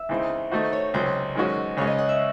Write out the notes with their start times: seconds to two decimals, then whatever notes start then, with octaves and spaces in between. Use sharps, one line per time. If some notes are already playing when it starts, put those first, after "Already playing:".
Already playing: E5
0.09 C#2 C#3 E3 C4 D#4
0.52 D#3 A3 D#4 F#4 C5
0.73 C#5
0.94 C#2 C3 F#3 C#4 C5
1.35 F#2 D#3 G#3 C#4 F#4
1.77 C#2 C#3 G#3 C#4 C#5
1.87 D#5
1.99 F#5
2.09 E5